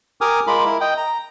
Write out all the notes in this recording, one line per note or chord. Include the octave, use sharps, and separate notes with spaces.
G4 A#4 G#5 D6 D#6 F6
G#3 F4 A#4 B5 D6
E4 A#4
D#5 G5
A#5